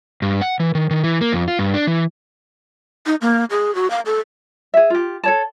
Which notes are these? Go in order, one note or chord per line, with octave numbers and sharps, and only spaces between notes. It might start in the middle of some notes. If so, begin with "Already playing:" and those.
G2
F#5
E3
D#3
D#3
E3
A#3
F2
F4
G2
D4
E3
D#4
A#3
G#4
F#4
F5
A4
G#4 E5
F4 G4
A4 C#5 A5